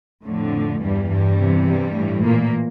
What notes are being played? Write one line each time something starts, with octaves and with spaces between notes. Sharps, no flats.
F2 A2 D3 A3
E2 G2 E3 G3
G2 G3
E2 C3 E3
G2 G3
A2 E3
A#2 A#3